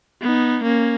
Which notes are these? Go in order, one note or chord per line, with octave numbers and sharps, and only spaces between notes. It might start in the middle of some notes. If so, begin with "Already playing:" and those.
B3 D#4
A#3 C#4